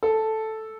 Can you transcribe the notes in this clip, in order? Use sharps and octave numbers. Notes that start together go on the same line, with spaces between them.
A4